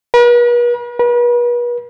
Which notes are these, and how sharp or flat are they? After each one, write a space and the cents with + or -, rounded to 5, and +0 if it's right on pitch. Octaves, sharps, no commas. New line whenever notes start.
B4 -45
B4 -40